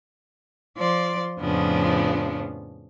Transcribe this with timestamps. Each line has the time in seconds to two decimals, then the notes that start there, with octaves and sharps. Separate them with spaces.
0.76 F3 D5 C6
1.39 F2 A2 C#3 F3 B3 D4